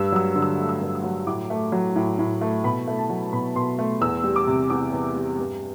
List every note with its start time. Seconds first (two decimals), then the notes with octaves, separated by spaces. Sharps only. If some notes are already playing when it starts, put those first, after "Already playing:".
Already playing: G2 E6
0.12 F#3 E6
0.35 D3
0.42 E6
0.58 A3
0.69 E6
0.82 G2
0.95 E6
1.04 F#3
1.27 A2 D6
1.50 A3
1.72 F#3
1.96 A2
2.19 A2
2.41 A3
2.64 B2 B5
2.88 A3
2.99 A5
3.10 F#3
3.33 B2 B5
3.55 B2 C6
3.79 A3
4.01 E2 E6
4.24 G3
4.36 D6
4.47 C3
4.70 E2 D6
4.93 E2
5.16 G3
5.39 G2